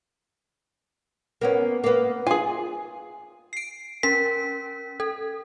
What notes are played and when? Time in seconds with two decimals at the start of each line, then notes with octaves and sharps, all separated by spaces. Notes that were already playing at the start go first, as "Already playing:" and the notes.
1.41 A#3 B3 C#4
1.84 A#3 B3
2.27 F4 G#4 G#5
3.53 C7 D7
4.03 C#4 A#4 B6
5.00 A4